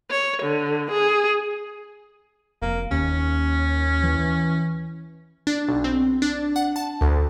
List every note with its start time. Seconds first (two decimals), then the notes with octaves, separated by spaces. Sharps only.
0.11 C#5
0.42 D3
0.91 G#4
2.62 F1 A#3
2.91 D#2 C#4
4.03 E3
5.47 D4
5.68 B1
5.84 C4
6.22 D4
6.56 F#5
6.76 A5
7.01 D2